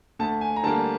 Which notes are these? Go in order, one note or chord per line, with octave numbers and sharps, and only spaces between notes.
D2 A5
G#5
A#5
D3 G3 A#3 A5